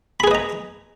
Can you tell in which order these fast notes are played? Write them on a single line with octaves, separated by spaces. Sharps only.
B5 G#4 B4 D#5 A#5